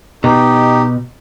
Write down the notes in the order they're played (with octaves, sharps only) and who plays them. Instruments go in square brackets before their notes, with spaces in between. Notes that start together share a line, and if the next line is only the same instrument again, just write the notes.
[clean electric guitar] B2 [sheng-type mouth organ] D#4 G4